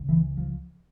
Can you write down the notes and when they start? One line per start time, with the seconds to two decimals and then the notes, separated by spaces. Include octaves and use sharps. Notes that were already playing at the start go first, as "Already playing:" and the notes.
Already playing: C#2 C#3
0.09 E3
0.37 F3